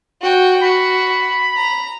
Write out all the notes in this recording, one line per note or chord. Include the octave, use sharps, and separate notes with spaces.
F#4 G5
F#4 B5
A#5